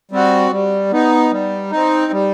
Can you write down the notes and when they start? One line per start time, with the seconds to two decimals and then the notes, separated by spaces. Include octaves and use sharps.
0.11 G3 C4 F#4
0.51 G3
0.92 B3 D#4
1.31 G3
1.71 C4 D#4
2.12 G3